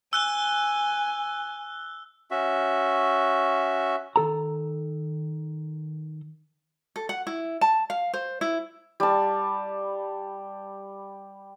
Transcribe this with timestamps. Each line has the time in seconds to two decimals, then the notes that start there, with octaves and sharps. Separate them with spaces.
0.13 G#5 E6 F#6 G7
2.31 C#4 F#4 E5
4.16 D#3 A4 A#5
6.96 A4
7.09 F#5
7.27 E4
7.61 A5
7.90 F5
8.13 C5
8.41 E4
9.00 G3 A5